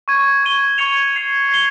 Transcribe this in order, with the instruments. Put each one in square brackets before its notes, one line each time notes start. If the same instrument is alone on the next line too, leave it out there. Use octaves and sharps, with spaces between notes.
[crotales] C#6 G#6 D#7
C#6 G#6 D#7 G7
C#6 G#6 C#7 F7
G#6 C7 F7
G#6 C7 G7